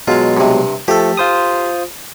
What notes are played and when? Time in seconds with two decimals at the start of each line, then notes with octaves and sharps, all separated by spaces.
0.08 B2 F#3 G#3 F4 F5
0.37 G2 C3
0.88 F3 A3 G4 A4
1.17 F4 C5 D#6